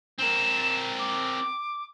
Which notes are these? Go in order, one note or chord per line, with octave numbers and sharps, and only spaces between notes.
C4 A#4 E7
D6